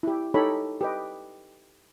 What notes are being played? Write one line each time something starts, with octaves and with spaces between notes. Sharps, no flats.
E4 G4
D#4 G4 A4 C#5 B5
G4 B4 D#5